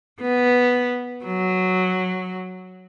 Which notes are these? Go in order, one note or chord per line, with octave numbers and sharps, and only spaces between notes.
B3
F#3